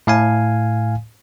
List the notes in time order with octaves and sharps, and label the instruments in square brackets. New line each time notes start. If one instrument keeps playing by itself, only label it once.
[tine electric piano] A2 F5 G#5